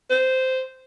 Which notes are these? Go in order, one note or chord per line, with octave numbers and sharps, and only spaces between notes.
C5